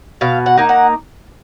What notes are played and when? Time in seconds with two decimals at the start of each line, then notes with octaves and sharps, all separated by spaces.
0.21 B2 F5
0.46 F#5
0.57 A#3 D#4
0.69 F#5